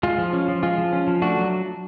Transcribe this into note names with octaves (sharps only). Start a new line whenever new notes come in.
G#3 F4
F3
C#4
F3
G#3 F4
F3
C#4
F3
A3 D4 F#4
F#3